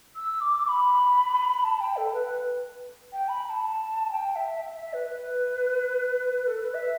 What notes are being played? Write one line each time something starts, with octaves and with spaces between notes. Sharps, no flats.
E6
D6
D6
B5
A5
G5
A4
B4
G5
B5
B5
A5
G5
E5
E5
E5
B4
B4
A4
B4
E5